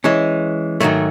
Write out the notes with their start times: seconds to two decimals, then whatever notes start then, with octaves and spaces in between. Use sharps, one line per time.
0.04 E3 G#3 C#4
0.80 G#2 D#3 F#3 A3